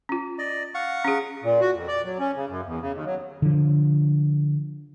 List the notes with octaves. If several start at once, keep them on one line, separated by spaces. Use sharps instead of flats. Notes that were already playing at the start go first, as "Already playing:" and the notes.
C#4 F4
D5 D#5
F5 F#5 C#6
C#4 G#4
A#2
F#4
F2
D5
F#3
C#4
C#3
F#2
E2
C#3
D#2
F#3
D3 F3